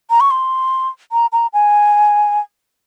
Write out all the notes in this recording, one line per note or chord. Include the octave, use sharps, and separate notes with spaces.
A#5
C#6
C6
A#5
A#5
G#5